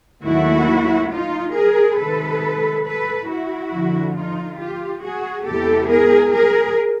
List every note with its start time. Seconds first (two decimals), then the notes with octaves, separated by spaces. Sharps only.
0.23 D#2 D#3 F#3 A3 E4 F#4
1.11 D#4 F4
1.54 G#4 A#4
1.97 C3 D#3 G#3 A4 B4
2.85 A4 B4
3.28 E4 F#4
3.72 F2 D3 F3
4.15 D#4 F4
4.58 F4 G4
5.02 F#4 G#4
5.45 E2 C3 E3 G#3 B3 G4 A4
5.89 G#4 A#4
6.32 G#4 A#4